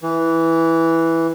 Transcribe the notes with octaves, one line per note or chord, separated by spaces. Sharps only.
E3